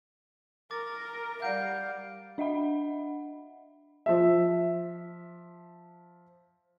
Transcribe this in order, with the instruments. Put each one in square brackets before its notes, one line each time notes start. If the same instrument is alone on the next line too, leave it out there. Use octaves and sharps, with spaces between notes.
[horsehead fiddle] A#4 [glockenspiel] D6 A6
[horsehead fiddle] G3 F5 [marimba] D5 F#5 [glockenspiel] G6 D7
[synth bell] D4 D#5 E5 F#5 B5
[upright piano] F3 E5